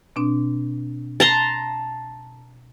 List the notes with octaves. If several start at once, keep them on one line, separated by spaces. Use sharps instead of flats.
B2 C4 D4
A5 A#5 C6